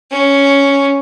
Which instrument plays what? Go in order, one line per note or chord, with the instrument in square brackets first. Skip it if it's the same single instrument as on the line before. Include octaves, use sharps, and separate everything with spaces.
[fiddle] C#4